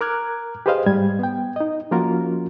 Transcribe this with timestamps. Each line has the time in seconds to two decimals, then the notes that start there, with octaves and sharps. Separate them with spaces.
0.01 A#4 A#5 D6 F6 F#6 G#6
0.66 G4 G#4 B4 C5 D#5 F5
0.86 G#2 G3 G#6
1.19 B3 G5
1.56 D#4 D#5
1.91 F3 A#3 C#4 F4 F#4 A#4